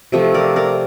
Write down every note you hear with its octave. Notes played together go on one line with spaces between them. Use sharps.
C3 F3 A3
A#4 D5
A#4 D5